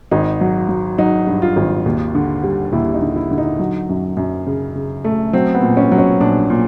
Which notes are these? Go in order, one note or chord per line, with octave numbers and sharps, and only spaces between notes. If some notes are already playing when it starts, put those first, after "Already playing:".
G#1 D#4
F#3
F#3
F#3 D#4
G2
F4
G#1
D#2
D3
G3
D#2 E4
D#4
D3
E4
D3
D#4
F#3
F#2
F#2
C#3
C#3
A3
F#3 C4
B3
A#2
C#4
F#3
C#4
A#1 D4
A#2